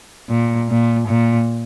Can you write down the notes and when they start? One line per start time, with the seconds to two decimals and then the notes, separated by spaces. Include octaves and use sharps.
0.30 A#2
0.69 A#2
1.08 A#2